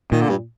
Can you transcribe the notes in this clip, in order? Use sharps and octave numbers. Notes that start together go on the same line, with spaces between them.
A#2 D#3
D3
G2